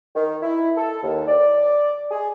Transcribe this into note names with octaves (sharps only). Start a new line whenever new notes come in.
D#3
E4
A4
D#2
D5
G#4